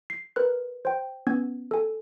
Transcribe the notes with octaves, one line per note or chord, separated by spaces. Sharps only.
C7
A#4 B4 F#6
C5 G5
B3 C#4 G#6
A4 G#5